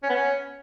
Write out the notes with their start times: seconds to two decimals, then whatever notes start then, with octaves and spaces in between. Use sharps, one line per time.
0.03 C#4
0.09 B3
0.16 C#4